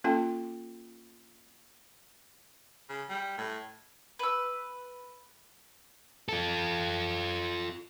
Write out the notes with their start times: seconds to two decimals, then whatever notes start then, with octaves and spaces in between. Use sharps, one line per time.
0.04 A#3 C#4 F4 A4 G5 A5
2.89 C#3
3.09 G3
3.38 A2
4.19 B4 E6
6.29 F4 A4